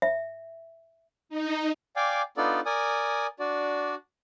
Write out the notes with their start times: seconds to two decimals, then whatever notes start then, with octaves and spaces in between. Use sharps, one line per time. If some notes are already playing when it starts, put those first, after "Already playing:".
0.02 E5
1.29 D#4
1.96 D5 F5 G5 G#5 D6
2.37 B3 D4 D#4 F4 A4 D5
2.66 A#4 D5 G#5 D#6
3.39 D4 F#4 D5